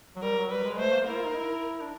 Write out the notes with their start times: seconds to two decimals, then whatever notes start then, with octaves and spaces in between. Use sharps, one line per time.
0.16 F#3
0.22 G3 A#4
0.37 F#3
0.51 G3 B4
0.64 G#3
0.79 A3 C5
0.93 A#3
1.07 E4 A#4
1.17 F4
1.26 D#4
1.36 E4
1.81 D4